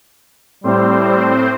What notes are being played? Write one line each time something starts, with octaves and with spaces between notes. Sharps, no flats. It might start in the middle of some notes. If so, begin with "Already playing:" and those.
A2 G3 C4 C5